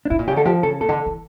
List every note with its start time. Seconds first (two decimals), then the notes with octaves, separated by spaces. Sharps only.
0.05 D4
0.10 A2 E4
0.19 A#2
0.28 C#3 G4
0.36 D3 A4
0.45 F3 G4
0.63 C#3 A4
0.81 A#2 A4
0.89 D3
1.06 E3